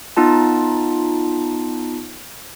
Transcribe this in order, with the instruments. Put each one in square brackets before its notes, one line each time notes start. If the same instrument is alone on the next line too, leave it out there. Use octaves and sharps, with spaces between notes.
[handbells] B3 D#4 F4 A5